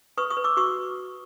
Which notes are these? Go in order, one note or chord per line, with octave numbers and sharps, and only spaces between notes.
B4 C#6 D#6
C#6 D#6
B4
D6 E6
F#4 C#6 D#6